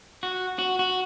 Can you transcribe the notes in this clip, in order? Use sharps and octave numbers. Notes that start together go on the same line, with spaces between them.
F#4
F#4
F#4